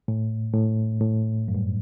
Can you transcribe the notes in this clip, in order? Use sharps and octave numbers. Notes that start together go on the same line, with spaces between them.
A2
A2
A2
F#2
G2